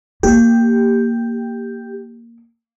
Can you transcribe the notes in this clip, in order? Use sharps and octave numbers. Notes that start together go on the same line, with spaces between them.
A#3 G4